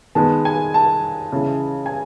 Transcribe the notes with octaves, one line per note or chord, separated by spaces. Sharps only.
D#3 G#3 B3 A5
G#5
A5
C#3 E3 G#3
G#5